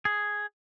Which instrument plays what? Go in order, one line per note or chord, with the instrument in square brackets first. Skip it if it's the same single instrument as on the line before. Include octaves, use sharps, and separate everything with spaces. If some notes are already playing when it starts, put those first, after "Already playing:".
[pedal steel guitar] G#4